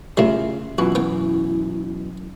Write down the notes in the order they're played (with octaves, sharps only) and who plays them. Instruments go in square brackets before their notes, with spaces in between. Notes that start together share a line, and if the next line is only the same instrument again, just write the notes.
[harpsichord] A2 G3 [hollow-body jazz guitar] C#3 F4 E5
[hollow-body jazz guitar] F#2 B2 E3 [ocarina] F4 [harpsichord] F#4
[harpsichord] B3 G5 [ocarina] E4